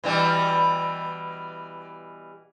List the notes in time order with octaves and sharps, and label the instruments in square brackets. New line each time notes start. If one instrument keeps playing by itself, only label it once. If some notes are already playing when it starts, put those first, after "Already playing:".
[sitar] B2 E3 G3